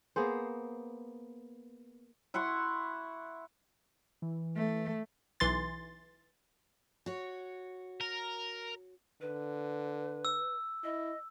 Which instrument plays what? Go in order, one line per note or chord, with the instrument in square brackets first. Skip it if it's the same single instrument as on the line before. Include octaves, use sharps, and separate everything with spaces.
[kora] A#3 B3 G#4 C5
[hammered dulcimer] E4 F#5 C6 C#6
[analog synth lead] E3
[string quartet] A3
[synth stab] B1 E3 C6 A6
[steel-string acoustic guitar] F#4 C#5
[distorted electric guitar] A#4
[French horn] D3 [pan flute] B4
[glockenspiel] E6
[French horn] E4 [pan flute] D#5